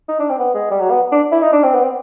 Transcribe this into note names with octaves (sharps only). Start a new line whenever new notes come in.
D#4
D4
C4
B3
G#3
G3
F#3
B3
D4
E4
D#4
D4
C4
B3
C4